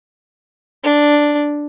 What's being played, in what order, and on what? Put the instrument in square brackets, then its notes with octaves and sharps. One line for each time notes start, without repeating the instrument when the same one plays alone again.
[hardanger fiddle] D4